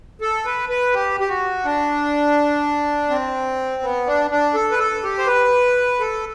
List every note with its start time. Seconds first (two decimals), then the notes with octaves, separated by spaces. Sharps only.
0.21 A4
0.45 B4
0.69 B4
0.94 G4
1.20 G4
1.29 F#4
1.65 D4
3.10 C4
3.83 B3
4.07 D4
4.31 D4
4.54 A4
4.71 B4
4.79 A4
5.03 G4
5.18 C5
5.27 B4
6.00 A4